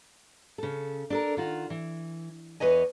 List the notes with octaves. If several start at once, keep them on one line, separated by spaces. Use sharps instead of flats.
C#3 A4
D4 A4 A#4
D#3 F4 F#4
E3
E2 B4 C#5 D#5 G#5